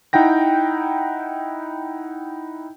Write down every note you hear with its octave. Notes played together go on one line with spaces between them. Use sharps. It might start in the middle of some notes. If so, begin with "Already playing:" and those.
D#4 E4 F#5 G5 A#6